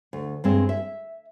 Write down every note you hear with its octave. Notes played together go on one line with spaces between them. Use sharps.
D2
G2 G#3 C4
E5